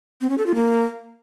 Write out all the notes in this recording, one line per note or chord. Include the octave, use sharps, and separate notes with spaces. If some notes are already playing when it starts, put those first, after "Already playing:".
C4
C#4
A4
F4
A#3